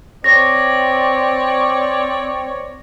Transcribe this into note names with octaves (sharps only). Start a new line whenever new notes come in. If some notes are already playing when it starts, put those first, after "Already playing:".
C4 C#5 D5 A#6